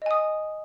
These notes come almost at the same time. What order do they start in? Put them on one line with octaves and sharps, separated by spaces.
D#5 G#5 D#6